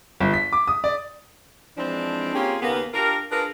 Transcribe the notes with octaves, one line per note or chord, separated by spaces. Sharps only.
G1
B6
D6
D#6
D5
E3 F3 G#3 C4 D4
A#3 C4 C#4 F4 G4 G#4
D#2 C#3 A#3 B3
D4 F4 G4 A#4
D4 F4 G#4 A#4 B4